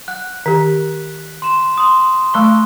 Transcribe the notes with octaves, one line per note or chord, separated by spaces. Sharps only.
F#5 F#6
D#3 G4 B6
C6 E7
C6 D#6
A3 A5 B5 C#6 F#6